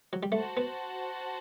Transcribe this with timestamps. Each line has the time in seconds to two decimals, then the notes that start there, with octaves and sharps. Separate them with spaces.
0.13 F#3
0.23 G3
0.32 A3 F#4 C5 F#5 A5
0.57 B3